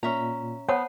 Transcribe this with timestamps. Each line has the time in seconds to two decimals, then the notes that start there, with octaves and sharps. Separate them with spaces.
0.03 A#2 C#4 E5 A#5
0.69 B3 C5 C#5 F#5 A5